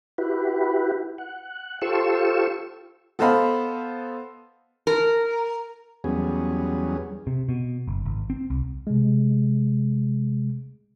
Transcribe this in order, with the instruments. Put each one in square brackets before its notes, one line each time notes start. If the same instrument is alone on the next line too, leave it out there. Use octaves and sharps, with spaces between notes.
[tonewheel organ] E4 F#4 G4 B4
F#5
F4 G4 A4 C5 C#6 E6
[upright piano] B3 A4 C5 D#5 F5 B5
[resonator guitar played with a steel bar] A#4
[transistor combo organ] E2 F#3 G3 B3 C#4 G#4
[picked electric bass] C3
B2
F#1
G#1
C4
C2
[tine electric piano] C3 G#3